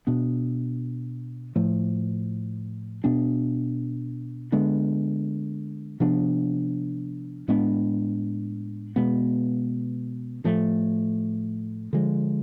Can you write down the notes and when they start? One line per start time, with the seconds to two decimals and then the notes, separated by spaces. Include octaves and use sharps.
0.07 B2 B3 D4
1.56 A2 F3 A3
3.04 B2 B3 D4
4.52 D3 G#3 B3 D4
6.00 C3 F3 B3 D4
7.48 A2 G#3 B3 D4
8.96 B2 G#3 B3
10.44 A2 F3 A3
11.93 D3 F3 G#3